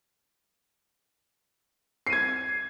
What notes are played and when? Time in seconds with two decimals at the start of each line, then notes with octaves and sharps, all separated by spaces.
2.07 C7
2.10 D#7
2.13 G#6